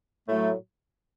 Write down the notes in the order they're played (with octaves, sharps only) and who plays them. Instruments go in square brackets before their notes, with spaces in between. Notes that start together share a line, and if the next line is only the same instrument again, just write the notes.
[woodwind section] A2 F#3 A3